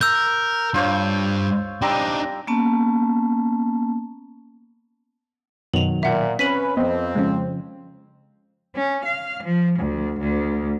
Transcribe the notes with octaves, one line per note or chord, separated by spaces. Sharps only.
A#4 E6 G6
G2 F4 C5 C#5
G3 C4 D4 D#4 A#5
A#3 B3 C#4 A5
F#2 B2 D#3 F#3 F7 F#7
A#2 E5 F#5
C4 C#4 B4 B6 D#7 F#7
F2 B3 C4 D#5
C#3 F3 G#3 C#4
C#4
F5
F3
D2
D2